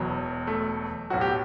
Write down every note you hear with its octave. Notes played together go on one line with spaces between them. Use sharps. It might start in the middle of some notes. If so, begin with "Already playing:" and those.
Already playing: E1 E2 B2 F#3
A3
B1 A2 F#3 F#4
G4